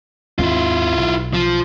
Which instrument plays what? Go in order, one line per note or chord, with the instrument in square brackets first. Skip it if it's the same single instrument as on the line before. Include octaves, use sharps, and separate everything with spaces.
[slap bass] D#2 G#2 C4 [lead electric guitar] E4 F4
[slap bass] B1
[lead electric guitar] F3